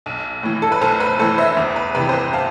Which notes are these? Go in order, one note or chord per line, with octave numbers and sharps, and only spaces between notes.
B1
A2 E3
A4
B4
B1 A4 C5
B4
A2 E3 A4 C5
C5 E5
E2
B4
C3 E3 B4
C5
B4
F5 A5